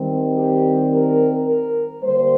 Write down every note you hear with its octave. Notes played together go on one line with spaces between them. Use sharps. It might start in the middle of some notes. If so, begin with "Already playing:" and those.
Already playing: D#3 G3 C4
G4
A#4
A#4
D3 G3 A#3 C5